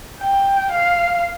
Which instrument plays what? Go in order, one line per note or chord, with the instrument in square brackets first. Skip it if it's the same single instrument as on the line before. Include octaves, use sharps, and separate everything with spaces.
[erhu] G5
F5